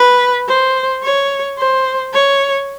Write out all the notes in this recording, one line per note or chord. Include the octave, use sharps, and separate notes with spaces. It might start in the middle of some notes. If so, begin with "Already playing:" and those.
Already playing: B4
C5
C#5
C5
C#5